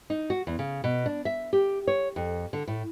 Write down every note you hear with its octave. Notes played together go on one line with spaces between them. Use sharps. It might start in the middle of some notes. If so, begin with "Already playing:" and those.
D#4
F#4
E2
C#3
B2
D4
E5
G4
C#5
F2
D3
A2